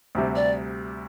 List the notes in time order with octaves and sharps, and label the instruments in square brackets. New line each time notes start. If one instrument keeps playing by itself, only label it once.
[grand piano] D2 C3 G3
[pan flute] D5